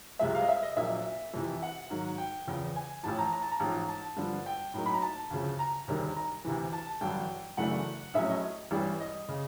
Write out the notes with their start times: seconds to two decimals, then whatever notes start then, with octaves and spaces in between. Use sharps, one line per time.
0.19 C2 C3 F3 G#3 E5
0.35 F5
0.42 D#5
0.49 E5
0.63 D#5
0.77 A#1 A#2 F#3 A#3 D4 E5
1.34 F2 C3 E3
1.62 F#5
1.90 G#2 D#3 F#3
2.18 G5
2.47 E2 C#3 F3
2.76 G#5
3.03 A1 A2 F3 A5
3.19 A#5
3.33 A#5
3.42 A5
3.52 A#5
3.60 A1 G#2 F3
3.88 A5
4.17 G2 D3 F3
4.46 G5
4.74 A2 F#3 A#3 D#4
4.86 B5
4.94 A#5
5.02 A5
5.31 D2 C#3 F3
5.59 A#5
5.88 E1 D2 C3 D#3 G3
6.16 A#5
6.44 D2 C3 E3
6.73 A5
7.01 A1 G2 D3 F#3 G5
7.57 F#2 C#3 E3 A3 D4 F#5
8.14 A#1 A2 F#3 A3 C#4 E5
8.29 D#5
8.71 A1 G2 E3 G3
9.00 D#5
9.29 C#3